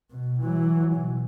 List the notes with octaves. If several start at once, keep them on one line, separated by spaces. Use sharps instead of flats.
B2
E3 F#3
B2